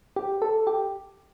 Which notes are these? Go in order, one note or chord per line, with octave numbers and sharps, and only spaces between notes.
G4
A4
G4